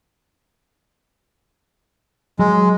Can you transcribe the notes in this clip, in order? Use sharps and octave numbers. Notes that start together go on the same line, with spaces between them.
F#3 G#3